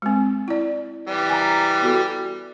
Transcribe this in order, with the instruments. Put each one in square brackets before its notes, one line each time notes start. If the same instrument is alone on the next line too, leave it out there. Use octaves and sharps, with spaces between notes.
[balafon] G#3 C4
E4 D5
[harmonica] E3 G3
[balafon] G#5 A#5
B3 F#4 A4